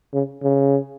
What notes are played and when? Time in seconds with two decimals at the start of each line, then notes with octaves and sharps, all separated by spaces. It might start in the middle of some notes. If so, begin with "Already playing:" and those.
0.13 C#3
0.43 C#3